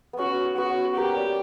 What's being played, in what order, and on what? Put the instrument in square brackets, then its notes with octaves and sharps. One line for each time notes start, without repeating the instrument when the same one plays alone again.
[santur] B3
[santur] C#4 [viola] F#4
[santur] B3 [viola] F#4
[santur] A#3 [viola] G4
[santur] G3